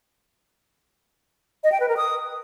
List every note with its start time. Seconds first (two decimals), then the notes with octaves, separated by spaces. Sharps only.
1.64 D#5
1.72 G5
1.80 B4
1.89 A#4
1.97 D#6